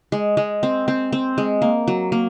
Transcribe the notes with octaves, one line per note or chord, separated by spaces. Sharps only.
G#3
G#3
C4
C4
C4
G#3
A#3
F#3
A#3